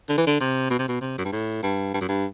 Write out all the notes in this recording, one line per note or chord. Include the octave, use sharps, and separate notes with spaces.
D3
E3
D3
C3
B2
C3
B2
C3
F#2
G2
A2
G2
G2
F#2
G2